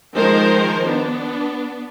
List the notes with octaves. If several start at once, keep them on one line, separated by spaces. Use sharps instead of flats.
D#3 F3 G#3 A#4 C5
B3 D4